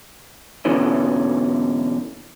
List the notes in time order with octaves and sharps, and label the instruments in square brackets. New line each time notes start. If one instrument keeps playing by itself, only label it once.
[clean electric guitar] E2 B2 D3 E3 C#4